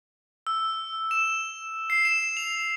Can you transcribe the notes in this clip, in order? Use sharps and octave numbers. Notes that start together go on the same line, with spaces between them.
E6
E7
C7
E7
F7